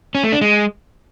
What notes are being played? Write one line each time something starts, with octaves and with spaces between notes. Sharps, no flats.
C#4
A3
D4
G#3